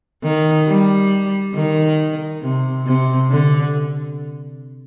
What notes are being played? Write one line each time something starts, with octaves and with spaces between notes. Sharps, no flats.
D#3
G3
D#3
C3
C3
D3